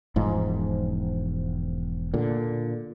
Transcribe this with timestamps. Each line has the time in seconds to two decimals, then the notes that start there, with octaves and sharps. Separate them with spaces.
0.16 E1 G#2 F3
2.14 A#2 D3